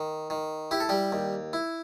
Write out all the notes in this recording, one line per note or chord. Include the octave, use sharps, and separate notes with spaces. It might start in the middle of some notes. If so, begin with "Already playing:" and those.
Already playing: D#3
D#3
E4 G4
A4
G3 G4
D#2
E4